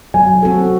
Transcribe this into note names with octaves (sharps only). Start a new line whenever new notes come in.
F#3 G#5
C4 F#4 A4